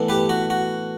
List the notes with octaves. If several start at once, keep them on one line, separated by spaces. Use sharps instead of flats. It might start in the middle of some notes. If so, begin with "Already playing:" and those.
Already playing: A2 E3 B3 D4
G4 B4
F#4
F#4